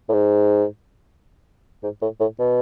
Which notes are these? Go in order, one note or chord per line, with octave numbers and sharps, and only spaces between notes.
A2
G#2
G#2
A2
A2
B2